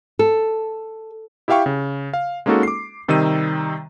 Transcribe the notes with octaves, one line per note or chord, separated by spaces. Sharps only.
A4
E4 G4 E5 F5 G5 C#6
C#3
F5
G#3 A#3 C#4 D#4 F#4 A4
D6 C7
C3 D#3 G3 D#4 E6 D#7